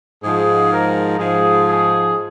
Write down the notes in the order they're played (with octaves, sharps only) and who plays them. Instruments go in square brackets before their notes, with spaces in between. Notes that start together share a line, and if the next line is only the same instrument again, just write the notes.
[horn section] G#2 F3 G#4
A#4
G#2 F3 G#4
G#4